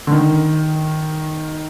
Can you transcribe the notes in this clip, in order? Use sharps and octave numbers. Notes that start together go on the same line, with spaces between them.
D3
D#3